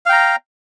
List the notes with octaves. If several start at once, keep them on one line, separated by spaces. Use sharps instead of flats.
F5 G5 A#5